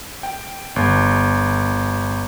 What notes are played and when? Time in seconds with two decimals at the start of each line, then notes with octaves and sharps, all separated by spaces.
0.23 G5
0.76 G1